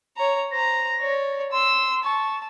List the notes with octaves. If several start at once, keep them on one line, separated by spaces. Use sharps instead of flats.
C#5 A#5
C5 A#5 A#6
C#5 D5
C6 E6
A5 C#6